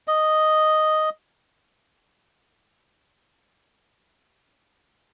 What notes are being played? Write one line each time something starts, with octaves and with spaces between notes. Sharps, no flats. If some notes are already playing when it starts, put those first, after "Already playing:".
D#5